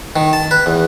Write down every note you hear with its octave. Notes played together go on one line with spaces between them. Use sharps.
D#3
A5
B4
E2